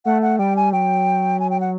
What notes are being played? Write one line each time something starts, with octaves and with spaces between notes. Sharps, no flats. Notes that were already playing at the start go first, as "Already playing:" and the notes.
A3 F#5
F#5
G3 G5
G#5
F#3 G5
G#5
G5
F#5